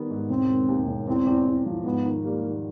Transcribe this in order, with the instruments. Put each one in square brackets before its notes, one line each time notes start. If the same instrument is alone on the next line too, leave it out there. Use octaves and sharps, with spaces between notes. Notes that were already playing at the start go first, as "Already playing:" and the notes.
Already playing: [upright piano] D#3 G3 B3
G#2
[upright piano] E1 [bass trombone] C4
[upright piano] D#3
D#2
E1
[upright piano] E2 [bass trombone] C4
[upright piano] E2
E2
F3
[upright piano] G#2 [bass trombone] B3
[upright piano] D#3
[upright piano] G3 [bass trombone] A#3
[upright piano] D#3